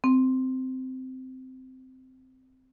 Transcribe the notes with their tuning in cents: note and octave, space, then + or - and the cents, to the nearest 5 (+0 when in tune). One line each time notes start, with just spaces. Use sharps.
C4 -15